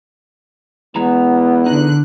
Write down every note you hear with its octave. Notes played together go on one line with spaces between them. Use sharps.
E2 G#3 B3 E4 A#5
D3 D#4 F#6